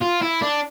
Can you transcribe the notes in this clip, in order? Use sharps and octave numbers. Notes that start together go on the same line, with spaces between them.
F4
E4
D4